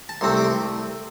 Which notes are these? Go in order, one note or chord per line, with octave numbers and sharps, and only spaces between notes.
A5
C2 C3 A3 C4 C6
D6
C6